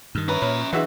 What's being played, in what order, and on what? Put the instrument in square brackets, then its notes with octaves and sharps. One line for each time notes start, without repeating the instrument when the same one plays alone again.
[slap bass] G2 D#3
[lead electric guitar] C#4 A#5 [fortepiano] B4
[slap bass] A#2 [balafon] C#5 B5
[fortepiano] B1 F#4 E5 [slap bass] E3 [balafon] D4 G#4 B4